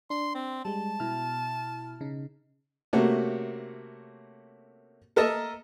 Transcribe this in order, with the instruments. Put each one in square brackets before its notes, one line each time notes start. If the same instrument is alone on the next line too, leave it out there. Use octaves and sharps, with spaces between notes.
[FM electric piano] D4 [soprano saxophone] C6
[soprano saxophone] C4
[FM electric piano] G3 G#3 [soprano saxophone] A5
[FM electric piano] B2 E4 F6
C#3 D#4
[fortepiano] C3 A3 A#3 C#4 F#4
A4 A#4 D#5 E5 A5 A#5